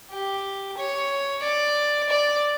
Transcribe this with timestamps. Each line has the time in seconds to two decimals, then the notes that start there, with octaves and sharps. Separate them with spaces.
0.11 G4
0.77 C#5
1.43 D5
2.09 D5